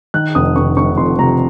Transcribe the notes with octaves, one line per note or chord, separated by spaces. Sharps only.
D#3 F#6
F1 D#6
F1 C#6
F1 C#6
F2 C6
C3 A#5